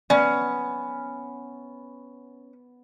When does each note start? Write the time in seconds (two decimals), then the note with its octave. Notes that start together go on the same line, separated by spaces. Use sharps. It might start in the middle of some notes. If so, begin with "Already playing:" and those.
0.10 B3 C#4 D5